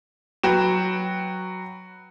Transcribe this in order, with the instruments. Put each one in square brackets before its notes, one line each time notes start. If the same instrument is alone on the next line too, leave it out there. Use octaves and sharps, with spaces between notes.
[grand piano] F#3 F#4 B4 G5 E7